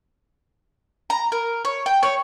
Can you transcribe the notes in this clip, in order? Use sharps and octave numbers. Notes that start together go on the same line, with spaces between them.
A#5
A#4
C#5
G5
C#5